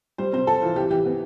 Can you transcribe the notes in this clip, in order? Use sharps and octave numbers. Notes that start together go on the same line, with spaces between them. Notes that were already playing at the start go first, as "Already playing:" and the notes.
G3 C5
C3 C5
C4 A4
E3 F4
E3 G4
E3 G4
B3